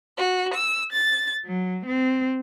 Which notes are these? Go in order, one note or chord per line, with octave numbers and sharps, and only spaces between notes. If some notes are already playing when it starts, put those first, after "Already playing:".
F#4
E6
A6
F#3
C4